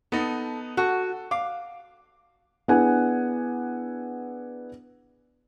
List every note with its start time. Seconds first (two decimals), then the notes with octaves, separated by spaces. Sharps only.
0.12 B3 D#4 A4
0.77 F#4 A4
1.31 F5 D6
2.68 B3 D4 E4 G#4 F#5 G#5